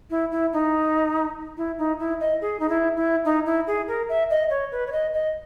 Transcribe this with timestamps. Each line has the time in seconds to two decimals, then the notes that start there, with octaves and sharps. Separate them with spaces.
0.10 E4
0.31 E4
0.53 D#4
1.57 E4
1.78 D#4
1.99 E4
2.20 D#5
2.41 G#4
2.60 D#4
2.69 E4
2.96 E4
3.25 D#4
3.46 E4
3.67 G#4
3.88 A#4
4.09 E5
4.30 D#5
4.50 C#5
4.72 B4
4.87 C#5
4.92 D#5
5.13 D#5